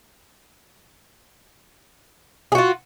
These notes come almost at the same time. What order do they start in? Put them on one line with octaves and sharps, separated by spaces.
G#4 F#4 F4